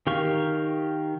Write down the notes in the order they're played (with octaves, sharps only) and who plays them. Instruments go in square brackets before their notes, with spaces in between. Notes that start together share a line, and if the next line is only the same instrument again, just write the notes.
[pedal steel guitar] D#3 G4 F5 C#6